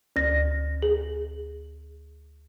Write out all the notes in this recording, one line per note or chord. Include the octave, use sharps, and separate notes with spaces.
D2 A#6
G#4